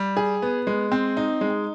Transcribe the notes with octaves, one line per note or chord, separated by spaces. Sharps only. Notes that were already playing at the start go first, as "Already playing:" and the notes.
Already playing: G3
G#4
B3
G#3
C4
D#4
G#3